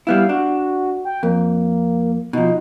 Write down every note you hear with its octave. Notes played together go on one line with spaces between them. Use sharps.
G3 B3 E4 F5
D4 F#4
G5
F2 A#3
B2 F3 D#4